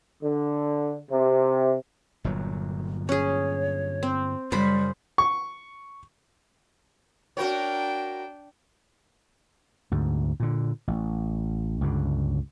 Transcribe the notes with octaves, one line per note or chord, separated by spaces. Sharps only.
D3
C3
G1 A#2 F#3
C#4 G#4 C#5
C4
F#2 C#3 G3 C5 B5
C#6
D4 F#4 A#4 C#5 G5
D2 G#2
A#2 D3
A1
C#2 G2 D3